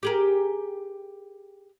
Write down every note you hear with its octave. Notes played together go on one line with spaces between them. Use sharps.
G4 G#4 A#4